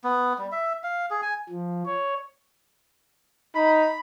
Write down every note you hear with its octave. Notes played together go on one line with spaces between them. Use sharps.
B3
G3
E5
F5
G#4
G#5
F3
C#5
D#4 B5